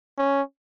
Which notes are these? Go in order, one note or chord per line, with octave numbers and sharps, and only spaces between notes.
C#4